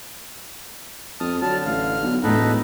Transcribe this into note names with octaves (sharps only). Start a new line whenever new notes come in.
F2 A5 D#6 F6
D3 F#3 A5 F6
A1 F5
B1
E1 A2 D#4 A4 B4 A#5